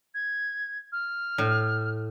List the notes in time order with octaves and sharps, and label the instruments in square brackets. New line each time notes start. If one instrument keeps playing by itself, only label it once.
[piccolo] G#6
F6
[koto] A2